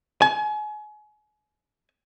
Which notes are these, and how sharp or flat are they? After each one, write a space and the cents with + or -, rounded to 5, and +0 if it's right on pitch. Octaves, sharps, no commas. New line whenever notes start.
G#5 +35